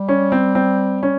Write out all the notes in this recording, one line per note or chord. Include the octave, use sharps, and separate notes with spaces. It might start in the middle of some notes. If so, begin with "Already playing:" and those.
Already playing: G3
C#4
C4
C4
C#4